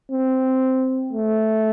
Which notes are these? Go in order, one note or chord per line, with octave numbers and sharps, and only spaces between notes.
C4
A3